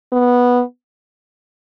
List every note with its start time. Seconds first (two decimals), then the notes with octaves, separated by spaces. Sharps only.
0.12 B3